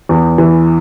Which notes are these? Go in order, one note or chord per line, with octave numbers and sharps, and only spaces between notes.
E2
E3